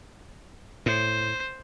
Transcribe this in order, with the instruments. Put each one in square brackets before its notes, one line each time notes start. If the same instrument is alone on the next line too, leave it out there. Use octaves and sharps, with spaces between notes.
[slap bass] A2 [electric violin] C5